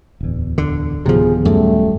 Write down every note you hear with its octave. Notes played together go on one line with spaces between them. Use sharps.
D1 E2
D3
D1 C3 D#3 F3 B3 G#4
F#2 G3 A3